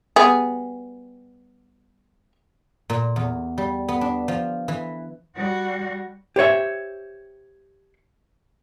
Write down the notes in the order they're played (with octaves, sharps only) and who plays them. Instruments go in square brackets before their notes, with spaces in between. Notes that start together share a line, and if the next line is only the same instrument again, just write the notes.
[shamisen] G3 B3 G#4
[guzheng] A#2
E2
G3
B3
D4
F3
E3
[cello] G3 F#4
[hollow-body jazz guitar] G4 C5 C#5 E5